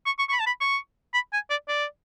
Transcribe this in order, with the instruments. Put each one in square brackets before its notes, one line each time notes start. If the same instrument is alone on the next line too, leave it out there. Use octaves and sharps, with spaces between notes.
[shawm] C#6
C#6
C#6
B5
A5
B5
C#6
B5
G#5
D5
D5